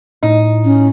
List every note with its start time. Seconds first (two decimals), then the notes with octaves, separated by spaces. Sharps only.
0.23 A2 D#4
0.65 C#4